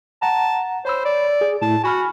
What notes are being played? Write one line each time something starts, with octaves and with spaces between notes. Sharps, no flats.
F#5 A5 A#5
C5 C#5 B5 E6
D5
G#4
A2 A5
F#4 G#5 B5 F6